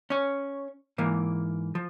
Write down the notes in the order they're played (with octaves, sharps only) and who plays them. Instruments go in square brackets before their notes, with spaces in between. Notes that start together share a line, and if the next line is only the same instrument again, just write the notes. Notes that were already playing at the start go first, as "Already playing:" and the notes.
[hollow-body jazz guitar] C#4 C#5
G#2 E3 A#3
F3